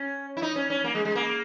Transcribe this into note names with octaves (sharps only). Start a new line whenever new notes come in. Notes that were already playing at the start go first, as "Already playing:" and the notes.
Already playing: C#4
E4
D#4
C#4
C#4
A#3
G#3
G#3
A#3